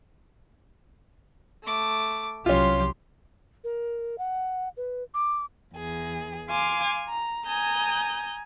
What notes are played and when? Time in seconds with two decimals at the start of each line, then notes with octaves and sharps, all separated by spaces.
1.64 A3 D6
2.46 C2 F3 F#3 C#4 F4 G4 C6
3.64 A#4
4.18 F#5
4.77 B4
5.14 D6
5.74 E2 G#4
6.48 F5 G#5 C6 D6
7.07 A#5
7.47 G#5 A#5 D#6 G6